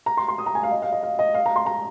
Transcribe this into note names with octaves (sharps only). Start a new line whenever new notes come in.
A#5
C6
C6
D#6
A#5
G#5
F5
D#5
F5
D#5
F5
D#5
F5
A#5
C6
A#5